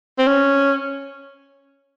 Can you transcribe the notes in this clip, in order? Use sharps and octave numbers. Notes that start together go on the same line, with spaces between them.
C4
C#4